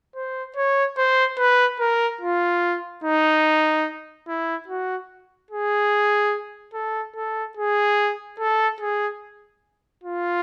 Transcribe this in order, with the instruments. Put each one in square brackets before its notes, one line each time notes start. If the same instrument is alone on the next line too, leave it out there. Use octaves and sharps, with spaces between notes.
[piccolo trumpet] C5
C#5
C5
B4
A#4
F4
D#4
E4
F#4
G#4
A4
A4
G#4
A4
G#4
F4